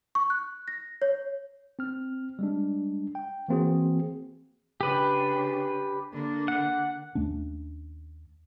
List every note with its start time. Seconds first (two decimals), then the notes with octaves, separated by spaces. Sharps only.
0.15 C#6
0.30 F#6
0.68 A#6
1.02 C#5
1.79 C4 F6
2.39 G3 G#3 D4
3.15 G5
3.48 E3 A#3 C4 F#4 G#4
4.81 C#3 D4 G4 B4
6.12 D3 A#3
6.48 F#5
7.15 D#2 A3 C#4 D4